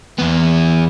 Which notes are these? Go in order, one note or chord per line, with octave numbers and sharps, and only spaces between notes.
E2 B3